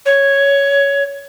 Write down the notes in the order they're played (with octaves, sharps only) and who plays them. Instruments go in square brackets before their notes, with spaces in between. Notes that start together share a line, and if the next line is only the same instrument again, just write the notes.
[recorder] C#5